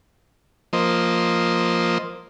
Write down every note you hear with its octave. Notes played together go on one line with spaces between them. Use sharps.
F3 A#3 C5 D#5